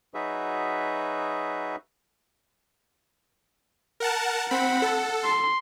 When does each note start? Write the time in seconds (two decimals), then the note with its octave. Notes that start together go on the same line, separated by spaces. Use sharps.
0.14 F#3 D#4 F#4 G#4 B4 E5
4.00 A#4 F#5 A5
4.51 C4 F#5 B5
4.82 A4
5.25 C6